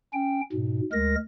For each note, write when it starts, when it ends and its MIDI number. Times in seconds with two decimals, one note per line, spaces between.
0.13 0.41 61
0.13 0.41 79
0.52 0.81 44
0.52 0.81 47
0.92 1.15 38
0.92 1.15 56
0.92 1.15 70
0.92 1.15 94